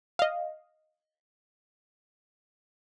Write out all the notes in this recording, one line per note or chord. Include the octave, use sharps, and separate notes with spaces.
D#5 F5